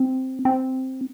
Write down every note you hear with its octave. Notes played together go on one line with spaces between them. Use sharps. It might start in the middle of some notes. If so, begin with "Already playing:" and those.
Already playing: C4
C4